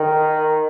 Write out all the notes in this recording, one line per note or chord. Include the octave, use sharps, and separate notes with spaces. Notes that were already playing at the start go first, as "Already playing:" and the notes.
Already playing: D#3